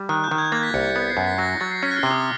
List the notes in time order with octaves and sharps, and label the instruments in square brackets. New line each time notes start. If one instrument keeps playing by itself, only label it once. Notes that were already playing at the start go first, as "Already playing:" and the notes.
Already playing: [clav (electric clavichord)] G3
[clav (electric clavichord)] D#3 [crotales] F#6
[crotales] G6
[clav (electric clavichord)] D#3
[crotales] G#6
[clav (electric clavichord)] A#3 [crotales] A6
[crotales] B6
[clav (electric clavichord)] C2 [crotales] C#7
[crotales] C#7
[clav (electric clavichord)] B3 [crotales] C#7
[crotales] C7
[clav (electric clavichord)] F#2
[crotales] B6
[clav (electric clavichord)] F#3 [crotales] A#6
[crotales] A#6
[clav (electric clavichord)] F#3 [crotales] A6
[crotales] C7
[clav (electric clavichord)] C#4 [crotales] B6
[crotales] F#6
F6
[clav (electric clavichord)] C3
[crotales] D#6